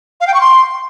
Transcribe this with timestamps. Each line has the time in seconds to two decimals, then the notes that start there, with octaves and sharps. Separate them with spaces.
0.21 F5
0.27 G5
0.34 C#6
0.41 C6